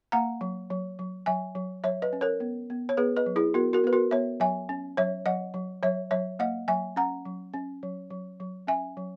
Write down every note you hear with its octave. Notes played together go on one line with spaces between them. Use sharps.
A#3 F#5 A#5
F#3
F#3
F#3
F#3 E5 G#5
F#3
F#3 C#5 E5
B4 D#5
C#4
A#4 C#5
B3
B3
C#5
B3 G#4 B4
B4 D#5
F#3
E4 G#4
B3 F#4 A#4
F#4 A#4
B3 B4
F#4 A#4
B3 C#5 E5
F#3 E5 G#5
C#4
F#3 C#5 E5
F#3 D#5 F#5
F#3
F#3 C#5 E5
F#3 C#5 E5
A#3 D#5 F#5
F#3 E5 G#5
C#4 F#5 A#5
F#3
C#4
F#3
F#3
F#3
C#4 E5 G#5
F#3